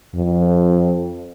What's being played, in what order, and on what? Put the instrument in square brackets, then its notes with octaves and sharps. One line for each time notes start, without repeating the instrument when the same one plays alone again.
[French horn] F2